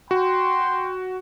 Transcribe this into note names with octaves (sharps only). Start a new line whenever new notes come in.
F#4 G5 C6